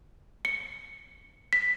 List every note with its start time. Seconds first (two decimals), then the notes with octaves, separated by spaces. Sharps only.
0.45 C#7
1.53 B6